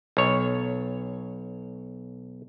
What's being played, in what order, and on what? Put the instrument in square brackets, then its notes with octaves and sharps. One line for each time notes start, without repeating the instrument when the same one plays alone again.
[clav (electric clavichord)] B1 C#5